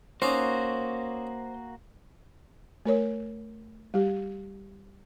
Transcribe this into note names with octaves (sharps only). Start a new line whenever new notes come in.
A#3 C#4 D#4 F#4 C5 D5
A3 A#4 C#5
G3 G4